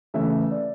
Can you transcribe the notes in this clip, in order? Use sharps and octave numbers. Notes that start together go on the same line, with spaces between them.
C#3 E3 A3 E5
D5